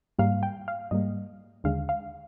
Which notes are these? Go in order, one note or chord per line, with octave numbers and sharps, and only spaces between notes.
G#2 G3 A#3 F5
G5
F5
G#2 G3 A#3 D#5
D#2 D3 G#3 F5
F5